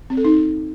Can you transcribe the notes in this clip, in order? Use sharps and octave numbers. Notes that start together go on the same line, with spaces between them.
C4
A4
D#4